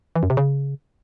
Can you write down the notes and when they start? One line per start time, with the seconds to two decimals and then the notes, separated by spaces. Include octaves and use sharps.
0.16 E3
0.23 F#2
0.30 C3
0.37 C#3